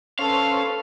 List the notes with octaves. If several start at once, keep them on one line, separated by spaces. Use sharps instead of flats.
C#4 A4 B4 C5 F5